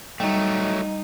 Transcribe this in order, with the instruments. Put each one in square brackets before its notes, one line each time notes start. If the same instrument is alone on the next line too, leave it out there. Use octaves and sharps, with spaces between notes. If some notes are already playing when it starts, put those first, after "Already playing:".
[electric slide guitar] F#3 A3 [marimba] G3 [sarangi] D#4